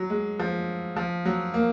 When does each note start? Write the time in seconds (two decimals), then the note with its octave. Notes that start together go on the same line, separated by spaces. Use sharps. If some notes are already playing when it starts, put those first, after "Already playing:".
Already playing: F#3
0.10 G#3
0.39 F3
0.97 F3
1.25 F#3
1.54 A#3